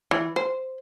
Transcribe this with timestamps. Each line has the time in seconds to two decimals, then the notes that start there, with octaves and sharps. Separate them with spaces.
0.11 E3
0.36 C5